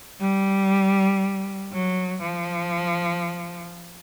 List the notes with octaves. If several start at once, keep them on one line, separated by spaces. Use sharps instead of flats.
G3
F#3
F3